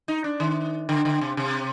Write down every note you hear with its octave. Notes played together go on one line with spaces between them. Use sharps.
D#4
D4
D#3
D3
D3
C3
C3